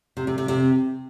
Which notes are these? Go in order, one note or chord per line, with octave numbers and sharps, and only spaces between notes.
C3
C3
C3
C3